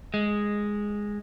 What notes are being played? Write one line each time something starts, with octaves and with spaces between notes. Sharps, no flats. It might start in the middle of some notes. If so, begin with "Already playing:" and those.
G#3